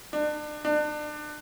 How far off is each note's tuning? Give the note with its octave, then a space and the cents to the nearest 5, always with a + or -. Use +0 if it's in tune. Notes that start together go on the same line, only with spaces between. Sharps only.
D4 +30
D4 +30